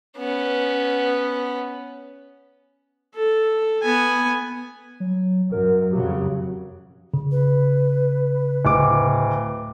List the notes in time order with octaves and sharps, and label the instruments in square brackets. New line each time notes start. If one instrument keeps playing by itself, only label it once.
[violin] B3 C#4
[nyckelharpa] A4
B3 G#5
[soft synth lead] F#3
[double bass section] F#2 [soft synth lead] A#4
[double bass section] F2 C#3 F#3 [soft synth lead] G4
[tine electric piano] C#3
[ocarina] B4
[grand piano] D1 D6